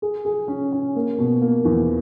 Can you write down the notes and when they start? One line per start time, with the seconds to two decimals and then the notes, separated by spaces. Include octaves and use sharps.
0.02 G#4
0.25 G#4
0.48 C#4
0.72 C#4
0.96 A#3
1.18 B2
1.42 A#3
1.65 E2